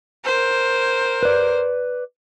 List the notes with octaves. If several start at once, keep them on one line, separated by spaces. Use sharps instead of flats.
A#4 C5
B4 D5